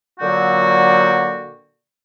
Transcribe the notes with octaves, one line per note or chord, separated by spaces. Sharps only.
A#2 D3 F#3 A#3 F#4 G5